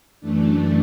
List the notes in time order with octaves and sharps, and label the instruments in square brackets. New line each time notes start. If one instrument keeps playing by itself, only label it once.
[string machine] F#2 E3 A3 D4